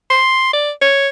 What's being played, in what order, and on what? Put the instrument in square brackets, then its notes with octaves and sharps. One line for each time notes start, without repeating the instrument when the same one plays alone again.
[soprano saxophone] C6
D5
C#5